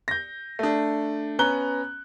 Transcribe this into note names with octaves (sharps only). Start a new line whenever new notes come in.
G6 A#6
A3 D4
B3 C#4 A#5 F#6 G7